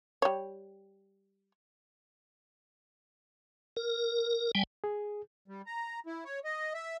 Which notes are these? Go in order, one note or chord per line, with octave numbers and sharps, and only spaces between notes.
G3 C#5
A#4
G3 G5 G#5
G#4
G3
A#5
E4
C#5
D#5
E5